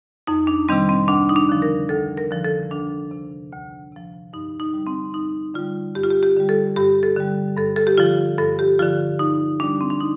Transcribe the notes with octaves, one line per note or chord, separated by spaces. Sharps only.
F2 D#4
D4
C3 D#3 G3 C4
C4
D2 D4
D#4
D4
D3 F3
A#4
D2 A4
A#4
D3 F3
A4
D2 D4
C3 F3
D2
C3 F3
G2 D#4
D#4
D3 G3
C4
G2 D#4
D3 G3 F4
G2 G4
F4
G4
G4
D3 G3
A4
G2 G4
A4
D3 G3
G2 A4
A4
G4
D3 F3 F4
G2 A4
G4
D3 F3 F4
G2 D#4
D3 G3 D4
C4
D4
D#4